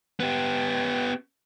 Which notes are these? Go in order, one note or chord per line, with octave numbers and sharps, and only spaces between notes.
B3 G4